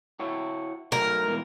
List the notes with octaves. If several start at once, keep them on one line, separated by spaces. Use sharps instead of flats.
E4 F#4 C#5
F#3 A3 D#4 A#4
G#2 B2 E3